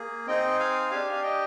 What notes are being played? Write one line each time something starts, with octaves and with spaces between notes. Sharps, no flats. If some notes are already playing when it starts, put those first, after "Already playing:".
Already playing: A#3 G#4
C4 D#4 G#4 D#5 G5
F5 G#5
D4 G4 F5 G#5
F5
D#5 G5